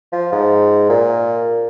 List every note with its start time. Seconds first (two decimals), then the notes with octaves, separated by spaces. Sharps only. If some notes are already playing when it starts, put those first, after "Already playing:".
0.12 F3
0.32 G#2
0.89 A#2